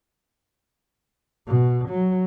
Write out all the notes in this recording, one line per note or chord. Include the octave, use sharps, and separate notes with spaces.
B2
F#3